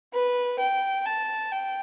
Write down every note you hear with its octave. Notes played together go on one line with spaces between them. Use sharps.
B4
G5
A5
G5